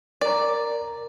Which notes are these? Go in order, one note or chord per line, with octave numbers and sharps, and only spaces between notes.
A#4 D5 A#5